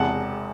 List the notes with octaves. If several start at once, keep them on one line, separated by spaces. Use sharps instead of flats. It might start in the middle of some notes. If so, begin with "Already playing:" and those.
Already playing: E1 E2 C3 F#5 A5